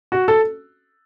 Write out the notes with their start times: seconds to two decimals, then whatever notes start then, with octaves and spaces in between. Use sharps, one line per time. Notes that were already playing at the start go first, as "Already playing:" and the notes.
0.12 F#4
0.28 A4